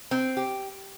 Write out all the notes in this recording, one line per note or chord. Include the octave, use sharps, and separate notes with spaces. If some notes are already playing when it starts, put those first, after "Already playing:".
C4
G4